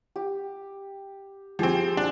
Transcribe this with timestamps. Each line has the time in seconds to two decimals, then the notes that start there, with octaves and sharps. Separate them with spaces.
0.16 G4
1.59 F3 C4 G4 G#4
1.97 D4